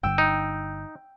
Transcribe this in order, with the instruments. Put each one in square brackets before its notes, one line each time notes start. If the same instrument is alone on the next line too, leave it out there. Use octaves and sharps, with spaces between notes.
[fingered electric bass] G1 G2 D3 [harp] G5 E6
[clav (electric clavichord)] D#4